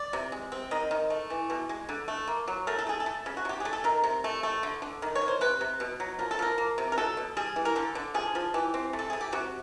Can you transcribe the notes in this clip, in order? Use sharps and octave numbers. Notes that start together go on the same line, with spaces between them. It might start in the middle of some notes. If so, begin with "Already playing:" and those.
Already playing: D5
C3
G#3
C4
D#3 D#5
D#3
A3
E3
B2
G#3
D3
A3
A#3
F#3
A3 A#4
A4
A3 G#4
A4
A3
C#3
F#4
C3 G4
A3 G#4
A4
D#3 A#4
C3
A3
A3
D3
D3
D#3
C#5
D#3
C5
C3 B4
C3
B2
F#3
F3 A#4
A4
F3 A#4
A#3
C3
A#4
F#3 A4
B2
G3 G#4
E3
A#4
D3 A4
D3
F3 G#4
F3
E3 G4
C4
A3
A4
A3 G#4
G4
C3 F#4